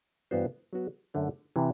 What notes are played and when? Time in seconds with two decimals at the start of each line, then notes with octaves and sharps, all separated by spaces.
0.31 G2 E3 B3 F#4 C5
0.73 F#3 B3 F#4
1.14 F#2 D3 A3
1.56 C3 E3